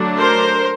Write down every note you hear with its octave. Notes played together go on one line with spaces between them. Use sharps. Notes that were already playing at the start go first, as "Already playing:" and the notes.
Already playing: D3 F#3 A3 D4
A#4 C5